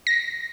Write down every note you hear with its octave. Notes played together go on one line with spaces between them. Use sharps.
A#6